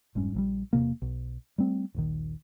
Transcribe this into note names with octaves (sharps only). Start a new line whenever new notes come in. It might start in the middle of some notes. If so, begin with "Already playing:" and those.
F1 G#2 G3 C#4
A#1 F#3 G3
E1 F#2 C3 A#3
B1
G3 A3 C4
D#1 A#1 D#3